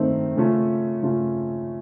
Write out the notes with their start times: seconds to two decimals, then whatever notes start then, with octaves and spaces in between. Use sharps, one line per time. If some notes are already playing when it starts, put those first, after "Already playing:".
Already playing: D#3 A3 C4 D#4
0.36 C#3 A3 C#4 F4
1.03 C#3 A3 C#4 F4